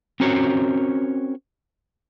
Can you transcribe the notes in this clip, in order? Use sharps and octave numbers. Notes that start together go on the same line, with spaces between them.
C4 C#4 F#4 A#4 C5 C#5